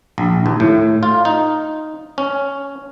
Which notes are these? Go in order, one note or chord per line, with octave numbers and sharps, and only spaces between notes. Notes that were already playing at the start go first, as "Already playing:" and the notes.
A#1
D#2
A2
F4
D#4
C#4